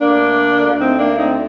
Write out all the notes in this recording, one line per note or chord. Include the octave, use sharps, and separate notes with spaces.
D2 D3 A3 A#3 D4
D2 D3 A3 C4 D#4
A#3 D4
C4 D#4